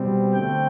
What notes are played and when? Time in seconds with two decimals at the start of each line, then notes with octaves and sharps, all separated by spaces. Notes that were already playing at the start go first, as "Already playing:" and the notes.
Already playing: B2 G3 C4
0.33 D3 A3 C4 G5